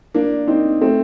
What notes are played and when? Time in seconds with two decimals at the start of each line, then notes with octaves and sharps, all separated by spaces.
0.14 A#3 D4
0.48 C4 D#4
0.81 A3 C4